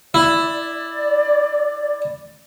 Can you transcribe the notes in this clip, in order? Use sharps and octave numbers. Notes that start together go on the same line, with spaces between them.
E4 D5